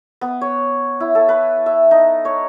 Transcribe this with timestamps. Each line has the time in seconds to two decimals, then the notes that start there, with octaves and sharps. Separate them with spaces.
0.21 B3
0.41 C#5
1.00 E4
1.15 A4
1.29 B4
1.66 E5
1.91 D#4
2.25 C#5